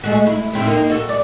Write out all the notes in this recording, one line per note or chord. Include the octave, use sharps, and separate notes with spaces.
G#3 A3 F#4
E4
A2 C4 E4
A#3 D#4
F#4 A4
D5